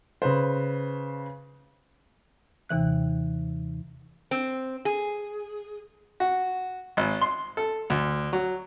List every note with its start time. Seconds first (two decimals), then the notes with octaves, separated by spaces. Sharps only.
0.22 C#3 B4 C5
2.69 D#2 C3 E3 F#6
4.31 C4
4.85 G#4
6.20 F#4
6.97 G#1
7.22 C6
7.57 A4
7.90 D2
8.33 F#3